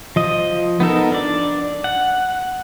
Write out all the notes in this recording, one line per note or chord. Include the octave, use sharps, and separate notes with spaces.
F3 D#5
B3 D#4 A4 A#4
D4 D5
F#5